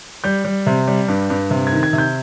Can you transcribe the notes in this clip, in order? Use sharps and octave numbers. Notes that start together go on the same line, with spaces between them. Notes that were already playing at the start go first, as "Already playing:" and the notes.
G3 G6
G3
C3
G3
G2
G2
C3
G#6
D#3
G#6
C3
G6